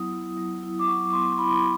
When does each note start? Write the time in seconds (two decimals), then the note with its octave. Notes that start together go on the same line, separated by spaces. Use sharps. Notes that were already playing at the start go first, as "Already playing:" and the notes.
Already playing: F#3 B3 E4 D#6
0.13 E4
0.37 F#3
0.63 E4
0.79 D6
0.88 F#3 C#6
1.13 B3 C6
1.32 C6
1.38 E4 B5